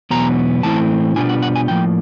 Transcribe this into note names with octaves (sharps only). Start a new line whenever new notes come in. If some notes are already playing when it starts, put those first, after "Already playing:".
E2 B2 F#3 B3 A#5
A2 E3 A3 C4 E4 A5
B2 G3 B3 D4 F4 G#5
F#5
F#5
G#5
A2 F3 A#3 G5